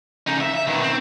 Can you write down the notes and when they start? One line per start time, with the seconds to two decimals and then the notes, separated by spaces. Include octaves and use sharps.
0.27 C#3 D#4
0.40 E5
0.54 E5
0.67 B2 D#3
0.82 C4